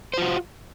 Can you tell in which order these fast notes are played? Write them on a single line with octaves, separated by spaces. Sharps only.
C5 F4 F#4